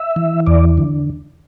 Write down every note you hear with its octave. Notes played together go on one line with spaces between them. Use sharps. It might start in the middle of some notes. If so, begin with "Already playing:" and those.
Already playing: E5
E3
E2 D5
D3